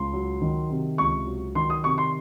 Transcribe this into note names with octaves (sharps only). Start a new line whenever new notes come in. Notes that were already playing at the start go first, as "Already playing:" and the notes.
Already playing: C#2 C6
F#3
D#3
C3
C#2 C#6
F#3
D#3 C6
D#6
C3 C#6
C6